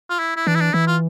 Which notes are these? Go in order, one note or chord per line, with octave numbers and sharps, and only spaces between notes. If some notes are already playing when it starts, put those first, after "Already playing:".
F4
E4
E4
E3 D4
E4
D4
E3 E4
F4